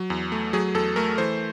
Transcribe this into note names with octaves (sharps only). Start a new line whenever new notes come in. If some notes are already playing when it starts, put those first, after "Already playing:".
Already playing: F#3
E2
A3
F#3 G#4
E2 A4
A3 A#4
E3 C5